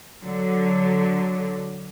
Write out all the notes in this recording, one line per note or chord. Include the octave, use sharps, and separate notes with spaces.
D3 F#3